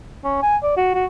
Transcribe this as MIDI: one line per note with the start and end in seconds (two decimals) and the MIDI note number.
0.24 0.40 61
0.42 0.57 80
0.63 0.72 74
0.77 0.93 66
0.94 1.06 66